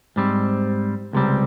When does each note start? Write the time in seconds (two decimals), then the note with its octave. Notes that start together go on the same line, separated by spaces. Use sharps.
0.16 G#2 G3 C4
1.13 C#2 C3 G3 C4